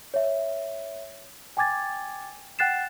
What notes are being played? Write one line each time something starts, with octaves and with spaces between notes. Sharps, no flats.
C#5 E5
G5 G#5 D6 G#6 A6
F#5 G5 F#6 A6 C7 E7